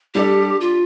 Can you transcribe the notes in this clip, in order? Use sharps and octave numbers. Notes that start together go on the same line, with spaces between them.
G3 D4 G4 A4 D5
F4